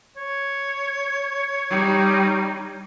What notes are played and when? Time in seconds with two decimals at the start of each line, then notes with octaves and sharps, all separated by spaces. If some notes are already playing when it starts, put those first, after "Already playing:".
0.17 C#5
1.70 G3 D#4